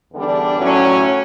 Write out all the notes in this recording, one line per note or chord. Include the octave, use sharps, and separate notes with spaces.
E2 D3 G3 D4
A2 F#3 C#4